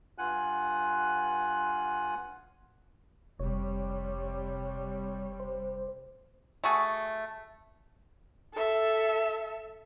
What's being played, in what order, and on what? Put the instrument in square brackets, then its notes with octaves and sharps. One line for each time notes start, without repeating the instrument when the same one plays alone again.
[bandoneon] G2 F4 F#5 G#5 F#6
[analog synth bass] F1 [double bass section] C3 G3 [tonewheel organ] C#5
[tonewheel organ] C5
[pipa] A3 F#4 G#4
[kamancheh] A4 E5